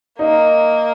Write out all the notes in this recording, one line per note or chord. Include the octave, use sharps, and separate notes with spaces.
A#3 D#4